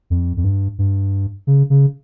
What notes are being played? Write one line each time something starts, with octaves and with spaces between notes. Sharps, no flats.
F2
F2
G2
G2
C#3
C#3